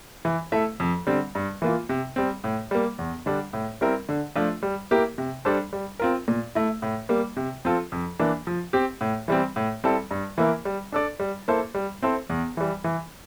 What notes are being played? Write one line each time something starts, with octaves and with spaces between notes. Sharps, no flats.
E3
A3 E4 A4 E5
F2
D3 G3 C4
G2
E3 A#3 F4
C3
G3 C4
A2
G3 A#3
E2
D3 G3 D4
A2
G3 C4 E4 A#4
D3
F3 A3 D4 F4
G3
A#3 E4 G4 A#4
C3
G3 D4 A4 C5
G3
C4 F4 A#4
A#2
A3 E4
A2
G3 A#3
C3
F3 C4 F4 A4
F2
E3 A#3 D4
F3
C4 G4
A2
E3 G3 C4
A2
G3 C4 E4 A4
G2
E3 A#3 E4 A#4
G3
D4 A4 D5
G3
A#3 E4 A4 C5
G3
C4 E4 A4 C5
E2
E3 G3
E3